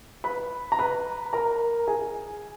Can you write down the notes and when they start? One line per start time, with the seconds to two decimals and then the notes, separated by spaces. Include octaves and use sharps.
0.24 B4 B5
0.72 A#5
0.79 B4 B5
1.33 A#4 A#5
1.87 G#4 G#5